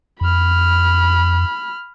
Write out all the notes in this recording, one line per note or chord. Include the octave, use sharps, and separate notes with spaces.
F2 B5 F6